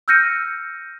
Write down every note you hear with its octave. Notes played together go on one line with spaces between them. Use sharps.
E6 F6 G6 A#6 C#7 D#7